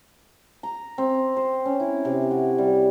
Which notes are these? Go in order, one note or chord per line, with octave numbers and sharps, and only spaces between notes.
A#5
C4
C5
C#4
E4
C3
F#4
G3